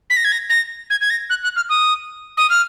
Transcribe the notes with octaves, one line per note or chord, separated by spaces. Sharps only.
B6
A#6
G#6
A#6
A#6
G#6
G#6
A#6
F#6
F#6
F6
D#6
D#6
F6